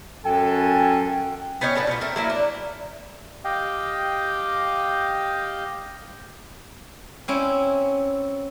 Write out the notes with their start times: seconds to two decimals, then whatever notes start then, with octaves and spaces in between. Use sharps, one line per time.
0.25 F#2 A4 G5 G#5
1.61 B3 C#4 D#4 C#5
1.75 A2 D4 B4 F#5
1.87 B2 B3 F4
2.01 A3 C4 A#4
2.16 F#3 A#3 E4
2.30 D4
3.44 G4 D#5 F5 G5
7.28 C4 C#4 E4